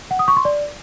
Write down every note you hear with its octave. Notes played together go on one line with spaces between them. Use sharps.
F#5
D#6
C#6
C6
D5